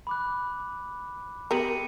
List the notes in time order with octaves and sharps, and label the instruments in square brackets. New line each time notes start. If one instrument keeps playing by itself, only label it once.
[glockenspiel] B5 D6 F#6
[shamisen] B3 G4 A#4 [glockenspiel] C#7 D#7 F#7